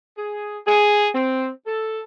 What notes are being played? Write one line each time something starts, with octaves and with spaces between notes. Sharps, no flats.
G#4
G#4
C4
A4